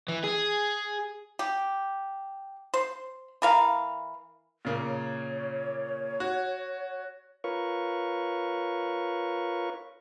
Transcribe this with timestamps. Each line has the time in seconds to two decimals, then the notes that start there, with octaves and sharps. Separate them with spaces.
0.08 E3
0.24 G#4
1.39 G4
2.74 C5
3.42 E3 A#4 F5
4.65 A#2 C#3 A#3
4.87 C#5
6.20 F#4
7.44 F4 A#4 B4 C#5 C#6